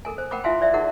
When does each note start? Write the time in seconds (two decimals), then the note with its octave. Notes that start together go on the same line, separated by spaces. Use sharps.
0.05 A4 A#4 G#5
0.18 C5
0.31 A#4 F#5 G5 B5 D6
0.44 E4 F4 E5 F5 G#5 C6
0.61 C5 D5 E5
0.73 D#4 E4 G#4 A#4 F#5